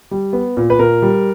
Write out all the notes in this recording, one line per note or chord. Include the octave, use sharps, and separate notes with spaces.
G3
B3
A#2
B4
A#2 A#4
G3